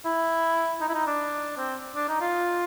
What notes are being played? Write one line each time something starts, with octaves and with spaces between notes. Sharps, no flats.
E4
D#4
E4
D#4
D4
C4
D4
D#4
F4